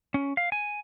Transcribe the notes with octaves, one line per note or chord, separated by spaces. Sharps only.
C#4
F5
G#5